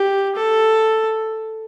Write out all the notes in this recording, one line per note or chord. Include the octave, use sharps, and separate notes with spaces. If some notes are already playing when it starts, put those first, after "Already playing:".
Already playing: G4
A4